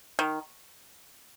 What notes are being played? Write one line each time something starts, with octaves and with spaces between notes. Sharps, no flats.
D#3